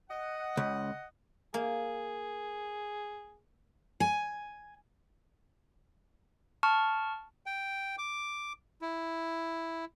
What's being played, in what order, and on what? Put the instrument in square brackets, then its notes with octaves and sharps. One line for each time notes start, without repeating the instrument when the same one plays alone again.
[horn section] D#5 F#5
[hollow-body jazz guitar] C#2
[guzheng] A#3 [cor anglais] G#4
[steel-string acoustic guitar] G#5
[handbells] A5 C#6 F6
[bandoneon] G5
D6
E4